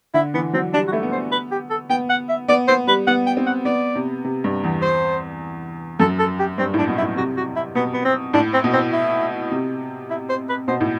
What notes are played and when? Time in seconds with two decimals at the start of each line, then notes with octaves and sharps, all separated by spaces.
0.14 D3 E4
0.34 E3 B3
0.53 F#3 C4
0.73 G3 D4
0.88 F#4
0.92 A3 E4
1.03 B3
1.12 C5
1.32 B4
1.51 G4
1.70 A4
1.90 B3 G5
2.10 F#5
2.29 E5
2.48 B3 D5
2.68 B3 C5
2.87 G3 B4
3.07 B3 F#5
3.27 G5
3.37 C4
3.46 F#5
3.65 B3 D5
3.96 C3
4.25 C3
4.44 G2
4.64 E2
4.82 C5
6.00 F#2 A4
6.19 A4
6.39 G4
6.58 G2 C4
6.74 A2 D4
6.88 B2
6.98 E4
7.02 A2
7.16 C3 F#4
7.37 F#4
7.56 E4
7.75 B2 B3
7.93 B3
8.05 C4
8.34 A2 D4
8.53 C4
8.64 B2
8.73 C4
8.93 E4
9.52 C3
10.10 E4
10.30 C5
10.49 B4
10.68 B2 C5
10.81 A2